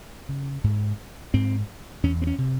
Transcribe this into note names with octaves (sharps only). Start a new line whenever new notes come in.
C#3
G#2
G#2 C4
E2 C#4
C4
C#4
C3